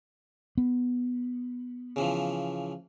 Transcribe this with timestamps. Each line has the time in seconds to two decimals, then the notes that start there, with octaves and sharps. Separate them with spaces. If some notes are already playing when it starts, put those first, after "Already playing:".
0.58 B3
1.96 C#3 E3 F3